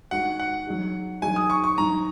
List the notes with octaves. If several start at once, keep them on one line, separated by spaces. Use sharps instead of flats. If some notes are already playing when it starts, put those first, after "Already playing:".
D#3 G#3 F#4 F#5
F#5
F#3 D#4 G#4
D#3 F#3 D#4 G#4 G#5
D#6
C#6
C#6
G#2 D#3 F#3 A#5